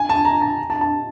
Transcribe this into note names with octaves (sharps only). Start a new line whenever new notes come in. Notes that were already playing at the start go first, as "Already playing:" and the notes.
Already playing: G#5
A5
A#5
A5
A5
A5